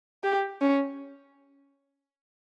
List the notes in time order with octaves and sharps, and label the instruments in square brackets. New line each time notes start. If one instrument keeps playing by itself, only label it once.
[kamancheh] G4
C#4